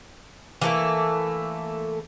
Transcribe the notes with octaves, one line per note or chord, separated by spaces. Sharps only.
E3 A3 A#3